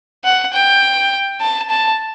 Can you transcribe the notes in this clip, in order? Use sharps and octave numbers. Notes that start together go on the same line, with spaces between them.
F#5
G5
A5
A5